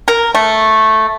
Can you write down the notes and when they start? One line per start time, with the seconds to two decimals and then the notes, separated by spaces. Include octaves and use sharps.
0.08 A#4
0.35 A3